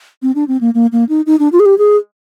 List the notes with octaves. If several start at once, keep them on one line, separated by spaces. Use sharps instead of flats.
C4
D4
C4
A#3
A#3
A#3
D#4
D#4
D4
F4
G#4
G4
G#4